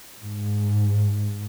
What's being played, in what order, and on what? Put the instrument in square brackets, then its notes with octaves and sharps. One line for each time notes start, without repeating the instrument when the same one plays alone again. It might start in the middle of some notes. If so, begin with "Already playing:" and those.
[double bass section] G#2